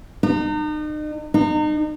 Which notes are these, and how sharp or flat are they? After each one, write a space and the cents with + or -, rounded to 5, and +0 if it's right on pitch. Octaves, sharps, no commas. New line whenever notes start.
D#4 -40
D#4 -35